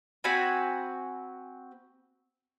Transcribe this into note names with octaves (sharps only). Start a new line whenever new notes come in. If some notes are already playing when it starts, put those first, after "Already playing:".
C4 F#4 G#5 B5